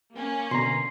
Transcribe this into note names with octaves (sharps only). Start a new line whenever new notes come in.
A#3 C#4
B2 D3 A#5 C6 C7